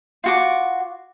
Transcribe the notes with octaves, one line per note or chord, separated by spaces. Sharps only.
F4 F#4 D6